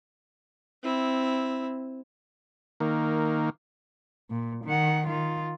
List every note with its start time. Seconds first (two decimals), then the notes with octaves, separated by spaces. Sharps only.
0.83 C4 E4
2.80 D#3 A#3
4.31 A#2
4.65 D#3 F#5
5.07 D#3 F4